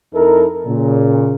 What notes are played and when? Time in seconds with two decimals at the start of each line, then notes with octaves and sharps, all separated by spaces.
0.14 F2 D#4 E4 A4 A#4
0.67 A#2 C#3